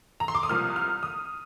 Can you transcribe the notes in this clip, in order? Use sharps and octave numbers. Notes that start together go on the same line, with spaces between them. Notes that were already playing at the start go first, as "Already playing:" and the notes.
A#5
C6
D6
D#6
C2 C3 F3 A#3 F6
F6
D#6